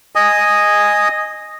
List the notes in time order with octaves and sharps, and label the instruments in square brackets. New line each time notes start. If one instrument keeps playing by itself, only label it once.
[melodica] D#5 G#5 D#6